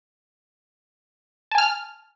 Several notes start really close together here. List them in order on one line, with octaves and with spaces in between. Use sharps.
A5 G#5 F6